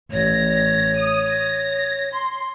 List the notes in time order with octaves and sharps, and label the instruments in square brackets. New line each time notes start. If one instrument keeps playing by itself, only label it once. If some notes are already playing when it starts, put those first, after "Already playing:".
[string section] A1 A#6 [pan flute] C#5
[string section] D#6
A#6
C6